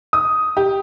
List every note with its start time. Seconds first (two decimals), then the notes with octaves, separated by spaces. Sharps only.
0.13 D#6
0.57 G4